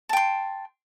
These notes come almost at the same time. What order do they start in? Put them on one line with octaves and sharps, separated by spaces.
A5 G5 C6